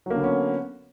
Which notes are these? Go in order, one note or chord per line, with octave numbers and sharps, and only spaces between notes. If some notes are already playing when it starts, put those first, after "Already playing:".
D3 F#3 A#3 B3 C#4